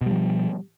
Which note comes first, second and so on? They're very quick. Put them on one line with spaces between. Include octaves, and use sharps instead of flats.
B2 G3 F3